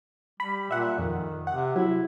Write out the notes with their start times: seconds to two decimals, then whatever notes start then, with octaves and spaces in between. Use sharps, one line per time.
0.40 G3 B5
0.71 A#2 E5 F#5
0.99 F2 D#3
1.47 C3 F#5
1.76 F#3 E4